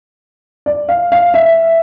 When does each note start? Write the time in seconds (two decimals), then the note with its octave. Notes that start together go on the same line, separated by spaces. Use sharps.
0.66 D5
0.89 F5
1.12 F5
1.34 E5